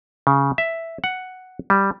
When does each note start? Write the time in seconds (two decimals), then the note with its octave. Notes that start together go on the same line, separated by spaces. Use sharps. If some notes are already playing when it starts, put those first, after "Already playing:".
0.27 C#3
0.58 E5
1.04 F#5
1.70 G3